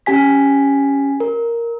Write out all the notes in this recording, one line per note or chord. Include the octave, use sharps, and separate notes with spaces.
C#4 G4 G#5 B6
A#4